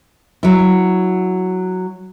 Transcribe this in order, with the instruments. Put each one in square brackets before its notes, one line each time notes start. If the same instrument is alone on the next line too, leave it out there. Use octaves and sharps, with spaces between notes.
[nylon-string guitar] F#3 E4